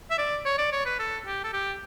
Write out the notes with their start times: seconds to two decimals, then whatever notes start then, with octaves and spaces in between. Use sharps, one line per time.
0.11 E5
0.18 D5
0.45 C#5
0.58 D5
0.72 C#5
0.86 B4
0.99 A4
1.26 G4
1.44 A4
1.53 G4